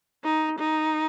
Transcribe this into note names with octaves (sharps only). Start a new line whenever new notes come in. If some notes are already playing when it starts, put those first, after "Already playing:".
D#4
D#4